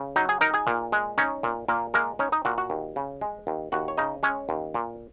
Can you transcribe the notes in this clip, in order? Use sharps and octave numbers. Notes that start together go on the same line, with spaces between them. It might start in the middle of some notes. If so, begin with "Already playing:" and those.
Already playing: C#3
F#3 D#4 D#5
G#4 G#5
D#4 A#4 A#5
G#4 G#5
A#2
G#3
C#4 D#4 C#5
A#2
A#2 A#3 A#4
G#3 A#3 A#4
C#4 D#4 C#5
D#4 D#5
A#2 F#4 F#5
F#4 F#5
D#2
C#3
G#3
D#2
D#2 F#4 F#5
C#5
C#3 D#4 D#5
G#3 C#4 C#5
D#2
A#2